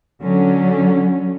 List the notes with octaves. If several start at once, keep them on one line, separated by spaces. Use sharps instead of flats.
D3 F#3 C#4